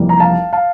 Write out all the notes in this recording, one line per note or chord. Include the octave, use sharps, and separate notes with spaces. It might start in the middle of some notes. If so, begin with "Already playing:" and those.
Already playing: F1 F2 E3 G3 A#3
A#5
F5 A5
F5 A5